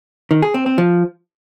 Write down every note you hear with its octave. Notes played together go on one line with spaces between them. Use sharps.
D#3
G#4
C4
C4
F3